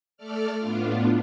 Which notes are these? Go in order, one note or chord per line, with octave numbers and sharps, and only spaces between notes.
A3 A4 D5 F6
A2 B3 D4 F4